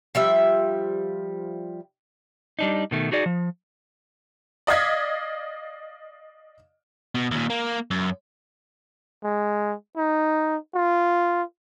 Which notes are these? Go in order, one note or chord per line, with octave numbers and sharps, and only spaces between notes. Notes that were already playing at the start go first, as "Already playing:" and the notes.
F3 G3 E5
G3 D4 D#4
B2 D#3 A3
D#4 F#4 G#4 D5
F3
D5 D#5 F5 G#6 B6
B2
D#2 A#2
A#3
F#2
G#3
D#4
F4